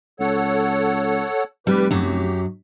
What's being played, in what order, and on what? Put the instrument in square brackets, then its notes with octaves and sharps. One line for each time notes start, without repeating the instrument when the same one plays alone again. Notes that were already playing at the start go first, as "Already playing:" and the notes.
[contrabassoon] C#2 [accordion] A4 C#5 F#5
[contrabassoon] F1 [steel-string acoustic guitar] G3 [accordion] G4 B4
[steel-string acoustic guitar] F#2 F#3 [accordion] G4